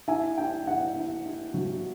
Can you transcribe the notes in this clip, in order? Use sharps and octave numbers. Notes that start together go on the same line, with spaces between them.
E4 G#5
E4 G5
E4 F#5
E4
E4
F#3